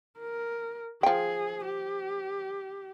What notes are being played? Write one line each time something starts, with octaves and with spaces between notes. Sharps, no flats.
A#4
F3 G#4 G5
G4